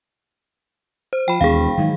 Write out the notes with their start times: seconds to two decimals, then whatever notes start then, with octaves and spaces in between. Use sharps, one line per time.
1.13 C5
1.28 F3 G5 B5
1.41 E1 D#2 G#4 F5
1.78 G#2 D#3 E3 F#3